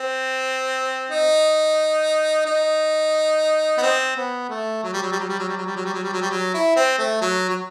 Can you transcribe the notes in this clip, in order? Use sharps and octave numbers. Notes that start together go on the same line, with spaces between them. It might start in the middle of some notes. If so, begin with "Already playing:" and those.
Already playing: C4
D#4
D#4
B3
C4
B3
A3
F#3
G3
F#3
G3
F#3
G3
F#3
G3
F#3
G3
F#3
G3
F#3
G3
F#3
G3
F#3
E4
C4
A3
F#3
F#3